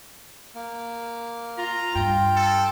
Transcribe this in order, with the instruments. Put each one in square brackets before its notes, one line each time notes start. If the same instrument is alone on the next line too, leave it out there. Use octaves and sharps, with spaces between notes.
[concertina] A#3
[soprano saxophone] F4 [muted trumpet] A#5
[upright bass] G2 [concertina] F4 [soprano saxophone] G5
[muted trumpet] A4